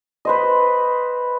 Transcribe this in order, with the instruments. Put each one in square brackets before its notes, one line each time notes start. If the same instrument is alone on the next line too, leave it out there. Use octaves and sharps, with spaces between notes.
[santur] B4 C5 D#5